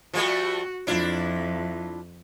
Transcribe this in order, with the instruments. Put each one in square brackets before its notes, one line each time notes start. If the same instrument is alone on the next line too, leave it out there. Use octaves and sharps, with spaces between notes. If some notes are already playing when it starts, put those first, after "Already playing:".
[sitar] F3 G3 A3 [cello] F#4
[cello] F2 [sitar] D4 E4 F4